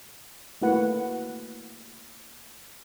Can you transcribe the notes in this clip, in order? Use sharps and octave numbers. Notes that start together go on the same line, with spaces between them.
A3 A#3 E4 F#4 B4 F#5